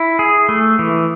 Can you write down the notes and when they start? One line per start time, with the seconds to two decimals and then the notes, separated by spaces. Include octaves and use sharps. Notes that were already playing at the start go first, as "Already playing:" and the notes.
Already playing: E4
0.19 G#4
0.49 A3
0.79 E3